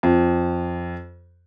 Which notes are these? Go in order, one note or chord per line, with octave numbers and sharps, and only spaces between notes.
F2